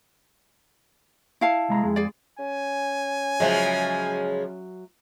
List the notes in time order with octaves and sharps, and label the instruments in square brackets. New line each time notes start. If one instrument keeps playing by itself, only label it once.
[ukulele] E4 F5 A5
[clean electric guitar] C2 G#3 A#5
F2 G#3
[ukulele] G#4 D5
[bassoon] C#4 [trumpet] G#5
[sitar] C#3 F3 G#3 [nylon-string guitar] F#3 E5